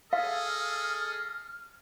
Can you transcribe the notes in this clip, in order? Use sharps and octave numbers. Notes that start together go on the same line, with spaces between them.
G#4 A4 D#5 F5 F6